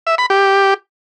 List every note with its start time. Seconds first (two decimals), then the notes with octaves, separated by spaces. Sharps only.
0.07 E5
0.18 B5
0.30 G4